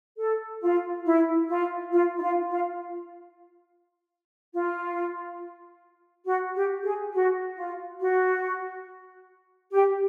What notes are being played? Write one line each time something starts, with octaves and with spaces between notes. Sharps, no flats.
A4
F4
E4
F4
F4
E4
F4
F4
F4
F#4
G4
G#4
F#4
F4
F#4
G4